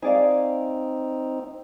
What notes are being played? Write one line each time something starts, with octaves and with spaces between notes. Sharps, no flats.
C4 D#4 G#4 D5 F5